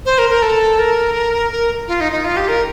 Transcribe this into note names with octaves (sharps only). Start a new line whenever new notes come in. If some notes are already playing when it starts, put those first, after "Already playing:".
C5
A#4
A#4
A4
A#4
A#4
F4
D#4
D#4
F4
G4
A#4